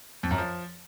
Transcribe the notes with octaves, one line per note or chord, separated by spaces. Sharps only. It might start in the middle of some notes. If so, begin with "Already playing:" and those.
F2
F#2
F3